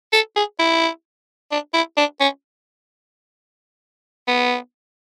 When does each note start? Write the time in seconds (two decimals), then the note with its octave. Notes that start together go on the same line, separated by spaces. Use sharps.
0.13 A4
0.36 G#4
0.59 E4
1.51 D4
1.74 E4
1.97 D4
2.20 C#4
4.28 B3